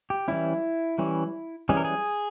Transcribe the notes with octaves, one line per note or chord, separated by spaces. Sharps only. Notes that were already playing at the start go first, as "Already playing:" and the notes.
G4
E3 G3 C#4 E4
E3 G3 C#4
E3 G3 C#4 G#4
A#4
G#4